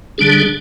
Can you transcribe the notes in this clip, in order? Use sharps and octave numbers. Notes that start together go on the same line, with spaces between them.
D3 G3 D4 G#4